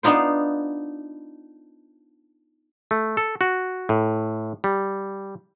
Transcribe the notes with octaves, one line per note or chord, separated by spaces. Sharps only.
B3 D4 D#4 F4 C5
A3
A4
F#4
A2
G3